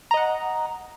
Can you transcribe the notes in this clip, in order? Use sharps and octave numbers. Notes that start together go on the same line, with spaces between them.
D#5 F#5 A#5